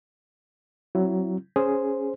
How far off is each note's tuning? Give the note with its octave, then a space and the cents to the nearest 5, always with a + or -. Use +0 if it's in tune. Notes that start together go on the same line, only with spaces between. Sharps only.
F#3 +20 C4 +25 E4 +20
C#4 +0 G#4 +0 C5 +0